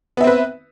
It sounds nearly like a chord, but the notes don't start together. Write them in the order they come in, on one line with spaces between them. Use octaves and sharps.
B3 E5 C4 B4